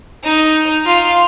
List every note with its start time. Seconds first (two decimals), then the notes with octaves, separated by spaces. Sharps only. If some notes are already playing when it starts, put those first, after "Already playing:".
0.24 D#4
0.86 F4